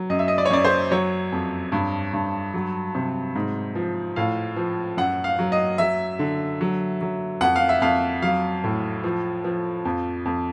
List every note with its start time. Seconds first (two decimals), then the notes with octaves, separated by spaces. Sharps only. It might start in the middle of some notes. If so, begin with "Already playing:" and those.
Already playing: F#3
0.10 F#2 D#5
0.19 E5
0.28 D#5
0.38 D5
0.45 C#5
0.50 F#2 D5
0.65 C5
0.91 F#3 C#5
1.32 F2
1.72 G2
2.13 G2
2.54 F#3
2.95 C3
3.35 G#2
3.75 F3
4.16 A2 F5
4.56 F3
4.97 F#2 F#5
5.24 F5
5.39 F#3
5.52 D#5
5.78 F#3 E5
6.19 D3
6.61 F#3
7.01 F#3
7.41 F2 F#5
7.56 F5
7.69 E5
7.81 F2 F5
8.22 F#3 F5
8.64 A2
9.04 F3
9.44 F3
9.85 F2
10.25 F2